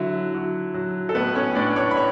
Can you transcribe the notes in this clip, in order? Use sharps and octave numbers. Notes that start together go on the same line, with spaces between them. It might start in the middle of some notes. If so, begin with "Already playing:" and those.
Already playing: D3 F#3 E4 E5
F#3
F#3
A4
A2 B3 B4
C#4 C#5
A2 D4 D5
C#5 C#6
B5
A2 C#5